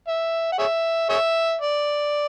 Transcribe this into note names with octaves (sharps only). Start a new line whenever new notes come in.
E5
F#5
G#4 C#5 E5
G#4 C#5 E5
D5